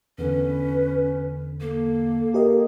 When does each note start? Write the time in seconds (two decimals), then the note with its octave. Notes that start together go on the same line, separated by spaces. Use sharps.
0.18 E2 D3 C#4 B4
1.61 A#3 A4
2.34 G4 A#4 D#5